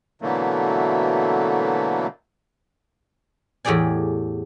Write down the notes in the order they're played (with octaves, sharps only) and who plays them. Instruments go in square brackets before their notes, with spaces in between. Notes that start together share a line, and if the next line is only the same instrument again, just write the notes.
[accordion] B2 D3 E3 F#3 A3 A#3
[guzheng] E2 A2 G4 G#4 D5 G#5